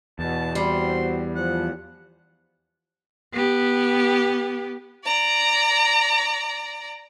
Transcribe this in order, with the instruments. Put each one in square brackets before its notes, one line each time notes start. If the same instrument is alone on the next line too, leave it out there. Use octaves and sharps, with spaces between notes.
[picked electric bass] E2 [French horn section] B2 [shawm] A5
[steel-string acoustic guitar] G3 [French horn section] C4 E4 F#4 [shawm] C6
[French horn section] F3 [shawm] F#5
[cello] B3 G4
[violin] D5 A#5